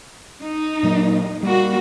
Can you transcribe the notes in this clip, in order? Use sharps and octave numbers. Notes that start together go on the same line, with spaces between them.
D#4
A#2 F#3 A#3
G3 A#3 F#4